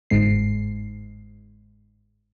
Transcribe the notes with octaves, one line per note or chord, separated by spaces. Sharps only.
G1 G#2 G#3 C7